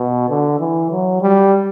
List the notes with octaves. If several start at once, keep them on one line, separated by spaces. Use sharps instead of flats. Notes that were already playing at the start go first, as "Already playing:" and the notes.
Already playing: B2
D3
E3
F#3
G3